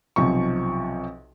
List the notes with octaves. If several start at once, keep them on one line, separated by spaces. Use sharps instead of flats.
B1 C3 F3 C#6